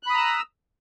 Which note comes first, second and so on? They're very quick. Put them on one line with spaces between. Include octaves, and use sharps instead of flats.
F#6 B5 D#6 A#5 E6